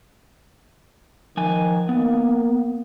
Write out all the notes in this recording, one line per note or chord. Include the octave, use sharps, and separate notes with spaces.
D#3 F3 G#5
A#3 B3